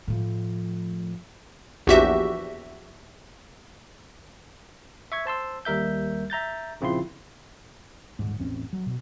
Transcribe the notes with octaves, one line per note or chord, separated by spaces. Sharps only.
A2 F3
A#1 E2 F#4 G4 E5
E5 C#6 G#6
C5 A5 C6 E6
D#2 G3 A#4 E5 G6
E5 A#5 G6 A6
A#1 C#3 C4 E4 F4 C6
D#1 G#2
A1 E2 C4 C#4
F#3
B2